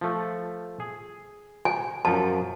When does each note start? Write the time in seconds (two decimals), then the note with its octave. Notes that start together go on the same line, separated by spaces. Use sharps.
0.01 F3 A3
0.80 G#4
1.65 G#5
2.05 F#2 F3 A5